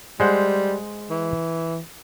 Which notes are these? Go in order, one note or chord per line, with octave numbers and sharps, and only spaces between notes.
G3 G#3 C5 F#5
E3